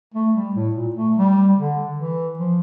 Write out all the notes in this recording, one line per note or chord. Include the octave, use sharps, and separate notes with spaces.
A3
G3
A2
A#2
A3
G3
D3
E3
F3